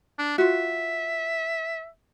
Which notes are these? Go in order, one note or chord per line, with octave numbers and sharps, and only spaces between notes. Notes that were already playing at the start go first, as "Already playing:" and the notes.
D4
F4 F#4 E5